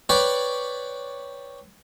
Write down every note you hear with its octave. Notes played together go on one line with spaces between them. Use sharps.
B4 C#5 D5 G5